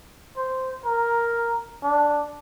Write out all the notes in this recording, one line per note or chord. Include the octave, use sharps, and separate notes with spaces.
C5
A#4
D4